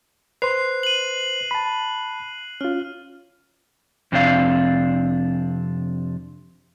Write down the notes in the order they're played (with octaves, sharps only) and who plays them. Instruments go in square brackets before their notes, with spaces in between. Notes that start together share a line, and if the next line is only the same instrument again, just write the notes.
[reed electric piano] B4 C5 C6 [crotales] F#6 C7 F7
[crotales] D#7 F#7
[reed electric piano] A5 B5
[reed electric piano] C#4 F4 [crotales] F6
[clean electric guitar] F2 C3 D4 F5